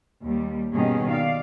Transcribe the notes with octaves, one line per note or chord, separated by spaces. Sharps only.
D#2 G3
G2 B2 D#3 C#4 G#4
D5 F5